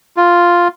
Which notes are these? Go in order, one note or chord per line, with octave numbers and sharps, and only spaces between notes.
F4